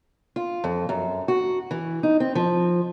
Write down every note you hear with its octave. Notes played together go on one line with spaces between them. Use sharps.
F4
F2
F#2
F#4
E3
D#4
C4
F3